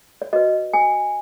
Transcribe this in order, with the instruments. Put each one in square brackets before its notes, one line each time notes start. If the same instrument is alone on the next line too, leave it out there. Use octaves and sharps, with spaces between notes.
[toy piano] D5
F#4 B4 D#5
G#5